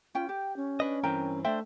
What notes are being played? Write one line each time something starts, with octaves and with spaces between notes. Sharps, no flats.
C#4 F4 G5
G4 G5
C#4
D4 B4 D#5
G2 E3 C4 A#4 G5 A#5
A3 D4 C5 E5 G5